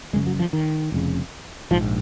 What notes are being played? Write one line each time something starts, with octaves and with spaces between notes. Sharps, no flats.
F#1 F#2 C#3 G#3
F#3
F3
D#3
F1 F2 C#3
A#1 G#2 F3